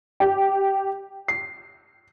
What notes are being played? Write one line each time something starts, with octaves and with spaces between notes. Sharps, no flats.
G4
C7